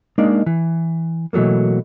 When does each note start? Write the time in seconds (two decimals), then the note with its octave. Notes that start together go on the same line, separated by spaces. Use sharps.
0.18 G#3 A#3 D4 D#4 D5
0.46 E3
1.33 B2 E3 F#3 A3 A#3